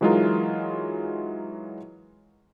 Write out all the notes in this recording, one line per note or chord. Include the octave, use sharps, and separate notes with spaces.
E3 F#3 G#3 D#4 F4 A#4